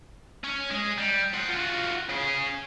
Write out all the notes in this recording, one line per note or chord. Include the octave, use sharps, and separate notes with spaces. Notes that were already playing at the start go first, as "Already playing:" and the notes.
C#4
G#3
G3
C5 F#5
F4 F#4
C#3 G#4